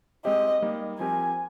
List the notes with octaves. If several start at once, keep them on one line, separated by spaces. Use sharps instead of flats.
G#3 C4 G4 D#5
G3 A#3 D#4
F3 C4 G4 A#4 G#5